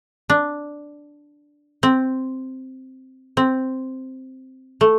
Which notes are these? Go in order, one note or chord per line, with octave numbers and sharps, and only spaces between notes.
D4
C4
C4
A3